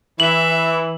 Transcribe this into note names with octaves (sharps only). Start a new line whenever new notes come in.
E3 E5 F#7